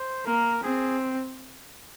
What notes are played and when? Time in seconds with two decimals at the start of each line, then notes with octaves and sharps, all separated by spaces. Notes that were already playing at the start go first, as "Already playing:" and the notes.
Already playing: C5
0.26 A#3 A#4
0.63 C4 G#4